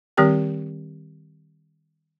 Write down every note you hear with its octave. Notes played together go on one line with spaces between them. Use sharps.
D#3 G3 C4 G4 A#4 G5